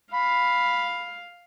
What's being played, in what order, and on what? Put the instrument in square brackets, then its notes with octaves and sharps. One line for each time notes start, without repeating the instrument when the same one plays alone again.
[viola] F5 [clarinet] B5